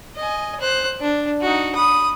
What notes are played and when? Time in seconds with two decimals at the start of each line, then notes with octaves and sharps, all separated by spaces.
0.16 D#5 G#5
0.60 C5 F#6
1.00 D4
1.41 D#4 F#4
1.75 B5 D#6